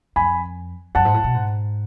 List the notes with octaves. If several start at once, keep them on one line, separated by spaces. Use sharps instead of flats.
F2 G#5 B5
F#2 F#5 A5
G#2
A2
B2
G#2